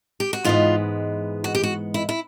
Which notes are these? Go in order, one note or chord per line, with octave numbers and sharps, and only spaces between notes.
G4
F#4
G#2 E3 G#3 B3 F4
F#4
G4
F#4
E4
E4